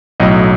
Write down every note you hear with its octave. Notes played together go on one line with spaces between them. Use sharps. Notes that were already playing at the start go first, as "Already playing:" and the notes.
B1 A2 F#3 D#5